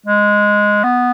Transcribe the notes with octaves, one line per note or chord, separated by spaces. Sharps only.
G#3
B3